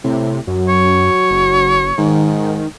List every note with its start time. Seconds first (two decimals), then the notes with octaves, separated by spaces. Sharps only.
0.04 A2 C3
0.47 F#2 F#3
0.69 C#5
1.30 F#1
1.98 G#2 D#3